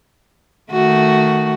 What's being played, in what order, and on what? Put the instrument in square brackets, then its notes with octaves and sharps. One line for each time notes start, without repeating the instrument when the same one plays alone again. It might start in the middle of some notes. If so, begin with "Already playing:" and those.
[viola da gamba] D#3 A3 F#4